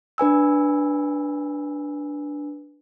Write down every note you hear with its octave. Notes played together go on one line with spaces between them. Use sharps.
D4 B4 G#5 E6